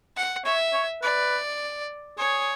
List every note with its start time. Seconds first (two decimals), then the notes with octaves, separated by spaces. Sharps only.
0.17 F#5
0.45 C#5 E5
0.74 C#5
1.02 B4 D5
2.18 G#4 C#5